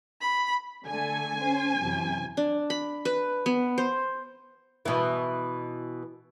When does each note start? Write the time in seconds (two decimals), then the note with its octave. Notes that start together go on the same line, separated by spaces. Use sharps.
0.21 B5
0.87 D3 A3 A4 G#5
1.40 C#4 C5
1.79 F#2 C3 E3
2.37 D4
2.70 B5
3.05 B4
3.46 B3
3.78 C5
4.85 B2 E3